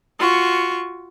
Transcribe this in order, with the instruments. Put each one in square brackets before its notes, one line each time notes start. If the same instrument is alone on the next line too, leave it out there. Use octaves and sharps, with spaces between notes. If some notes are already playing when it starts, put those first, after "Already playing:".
[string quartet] F4 F#4 C#6